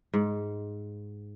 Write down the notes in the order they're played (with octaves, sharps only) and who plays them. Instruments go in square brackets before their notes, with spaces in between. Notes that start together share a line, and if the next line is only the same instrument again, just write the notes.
[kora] G#2